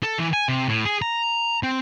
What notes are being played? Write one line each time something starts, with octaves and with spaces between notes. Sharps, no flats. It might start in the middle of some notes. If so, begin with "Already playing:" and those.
A4
E3
G#5
C3
A2
G#4
A#5
C4